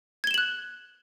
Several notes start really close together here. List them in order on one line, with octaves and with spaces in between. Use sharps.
G#6 G7 E7 F#7 F#6